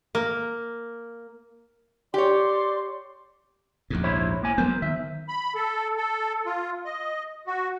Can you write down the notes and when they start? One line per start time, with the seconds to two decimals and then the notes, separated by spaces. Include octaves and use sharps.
0.15 A#3
2.14 G4 C#5 D5 C6 D6
3.90 A#1 D#2 G#2
4.04 E4 C5 C#5
4.42 A2 A#3 G#5
4.58 F#3 B3 A#4 C5
4.82 D#3 E5
5.28 B5
5.55 A4
5.98 A4
6.46 F4
6.85 D#5
7.47 F#4